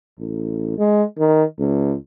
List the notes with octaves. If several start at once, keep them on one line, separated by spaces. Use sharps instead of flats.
A1
G#3
D#3
C#2